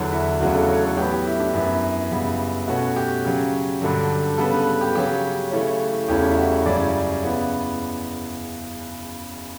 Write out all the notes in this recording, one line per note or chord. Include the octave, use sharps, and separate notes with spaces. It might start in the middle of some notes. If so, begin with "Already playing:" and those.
Already playing: E2 D3 F#3 F#4
E4
E2 C#3 F#3 A3 F#4
A4
C#5
A4
A2 F#3 B3 G4
G4
E4
D4
F#2 E3 B3 E4
F#2 C#3 G3 B3
B2 A3 C#4 F#4
G4
C#3 F#3 C#4
G2 D3 F#3
C#3 G3 B3 A4
B4
G4
C#3 F#3 C#4 G4
C#3 E3 A3 C#4
E2 C#3 E3 A3 C#4 G4
E4
F#4
F#2 C#3 G3 C#4 D5
C#3 E3 B3